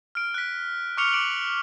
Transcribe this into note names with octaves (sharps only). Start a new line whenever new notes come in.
F6 D7
F#6 B6
C#6 D6 F6 C#7 F7 G7
D6 D7 F#7